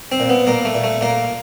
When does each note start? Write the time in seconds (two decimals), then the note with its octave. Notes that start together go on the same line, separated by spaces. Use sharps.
0.12 C4
0.20 A#2
0.29 B3
0.47 A#2 A#3
0.65 A3
0.75 A#2
0.84 A3
1.01 A#2 A#3